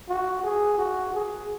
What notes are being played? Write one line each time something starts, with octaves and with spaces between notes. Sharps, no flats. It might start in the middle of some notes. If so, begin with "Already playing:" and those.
F#4
G#4
F#4
G#4